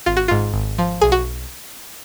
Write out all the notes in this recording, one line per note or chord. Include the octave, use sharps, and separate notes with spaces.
G#1 F4
F#4
G#2 F4
G#1
F3
B1 G#4
F#4